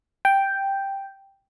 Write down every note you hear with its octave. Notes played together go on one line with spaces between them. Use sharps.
G5